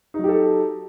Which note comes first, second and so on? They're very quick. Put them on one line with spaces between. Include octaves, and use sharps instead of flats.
D#4 F#3 G4 A4